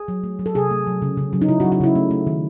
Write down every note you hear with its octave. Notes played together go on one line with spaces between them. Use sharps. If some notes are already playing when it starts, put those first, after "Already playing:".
Already playing: G#4
F#3
A3
F#3
A4
C3 G#4
A3
F#3
C#3
C#3
F#3
D#4
C#3 E4
F#4
F#3
F#4
C#3 E4
A3
A3
D#3